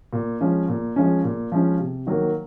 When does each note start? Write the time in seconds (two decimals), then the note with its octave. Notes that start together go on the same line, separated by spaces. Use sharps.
0.13 A#2
0.40 F3 G#3 C#4
0.69 A#2
0.96 F3 G#3 C#4
1.24 A#2
1.52 F3 G#3 C#4
1.79 C3
2.07 D#3 F#3 A#3